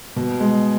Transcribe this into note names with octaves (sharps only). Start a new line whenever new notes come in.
B2
G#3